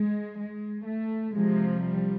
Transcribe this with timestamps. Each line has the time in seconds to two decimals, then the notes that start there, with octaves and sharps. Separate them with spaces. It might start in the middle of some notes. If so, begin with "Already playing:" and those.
Already playing: G#3
0.39 G#3
0.87 A3
1.34 C3 F3 G#3
1.81 G3